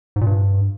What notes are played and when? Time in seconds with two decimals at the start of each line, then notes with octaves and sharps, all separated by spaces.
0.16 G#2
0.21 A#2
0.27 G2